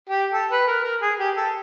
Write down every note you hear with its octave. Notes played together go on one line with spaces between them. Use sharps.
G4
A4
B4
A#4
A#4
G#4
G4
A4